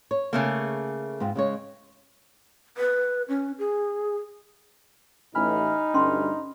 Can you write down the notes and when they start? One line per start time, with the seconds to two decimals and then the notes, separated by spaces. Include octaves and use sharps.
0.11 C#5
0.33 C#3 A3 A#3
1.20 G#2 C4 F4
1.35 C#3 G#3 C#5
2.77 B4
3.29 C#4
3.59 G#4
5.35 A1 D#4 G#5 B5 F6
5.94 D2 G2 C#4 C6